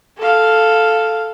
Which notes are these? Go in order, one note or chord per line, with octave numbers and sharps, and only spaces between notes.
A4 F5